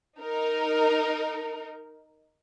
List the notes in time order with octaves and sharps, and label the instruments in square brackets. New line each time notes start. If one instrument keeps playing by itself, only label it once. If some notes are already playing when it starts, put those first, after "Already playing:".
[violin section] D#4 A#4